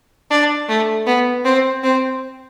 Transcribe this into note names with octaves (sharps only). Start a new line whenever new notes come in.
D4
A3
B3
C4
C4